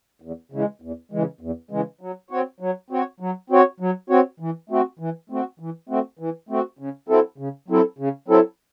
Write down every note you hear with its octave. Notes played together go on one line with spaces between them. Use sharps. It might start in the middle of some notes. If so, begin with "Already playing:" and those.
E2
C#3 E3 G#3
E2
C#3 E3 G#3
E2
C#3 E3 G#3
F#3
C4 F#4 C#5
F#3
C4 F#4 C#5
F#3
C4 F#4 C#5
F#3
C4 F#4 C#5
E3
A3 C4 F#4
E3
A3 C4 F#4
E3
A3 C4 F#4
E3
A3 C4 F#4
C#3
F#3 C4 E4 A4
C#3
F#3 C4 E4 A4
C#3
F#3 C4 E4 A4